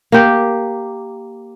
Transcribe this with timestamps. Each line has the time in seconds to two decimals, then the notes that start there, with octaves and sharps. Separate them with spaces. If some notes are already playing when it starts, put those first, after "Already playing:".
0.12 A#3 G4